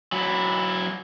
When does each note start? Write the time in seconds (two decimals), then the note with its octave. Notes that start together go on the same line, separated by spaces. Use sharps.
0.12 F#3 E4